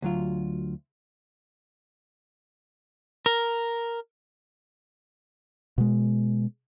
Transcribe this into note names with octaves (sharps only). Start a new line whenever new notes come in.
D2 F#3 F4
A#4
B2 G#3